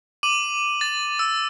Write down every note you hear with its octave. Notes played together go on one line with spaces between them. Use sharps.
D6 D#7 F#7
A6
E6